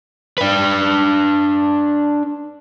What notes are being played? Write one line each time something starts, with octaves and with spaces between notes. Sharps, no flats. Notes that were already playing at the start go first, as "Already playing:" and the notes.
D4 B4